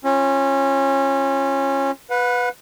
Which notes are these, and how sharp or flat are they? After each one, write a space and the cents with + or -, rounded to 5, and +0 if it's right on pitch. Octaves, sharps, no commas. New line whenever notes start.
C#4 -20 F4 -15
B4 +0 F#5 -45